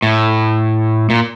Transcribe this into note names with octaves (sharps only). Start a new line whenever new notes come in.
A2
A#2